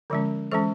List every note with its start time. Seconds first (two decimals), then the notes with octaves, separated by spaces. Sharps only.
0.10 D3 F3 G#3 C#4
0.52 E3 G#3 C#4 A4